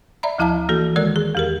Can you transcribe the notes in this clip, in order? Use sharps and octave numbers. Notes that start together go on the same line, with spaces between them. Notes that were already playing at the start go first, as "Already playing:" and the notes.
D5 E5 A#5 B5
D2 F3 E4 F5 A5 A#5
E3 A#3 F#4 A4
D#3 G#3 A#4 D5 F#6
G#4
E2 G4 A#4